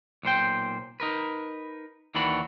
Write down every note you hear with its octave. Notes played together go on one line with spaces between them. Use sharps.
B1 A#2 C5 G5
D#4 A#4 B4
D#2 D#3 E3 D4 F#4 B5